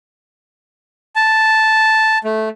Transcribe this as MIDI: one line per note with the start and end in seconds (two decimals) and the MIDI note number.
1.16 2.18 81
2.24 2.49 57